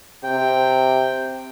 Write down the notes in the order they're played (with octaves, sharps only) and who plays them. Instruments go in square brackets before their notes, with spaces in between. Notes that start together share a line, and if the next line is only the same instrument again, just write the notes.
[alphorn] C3 [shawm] G5